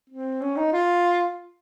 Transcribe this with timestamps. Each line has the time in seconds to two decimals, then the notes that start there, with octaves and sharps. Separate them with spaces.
0.10 C4
0.42 C#4
0.57 D#4
0.73 F4